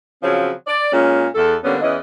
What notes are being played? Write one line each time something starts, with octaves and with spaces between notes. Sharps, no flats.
C#3 F3 F#3 C4 C#4
D5
A#2 G#3 C#4
E2 A4
D3 G3 A#3 B3 C#4
E2 E3 C#4 D#5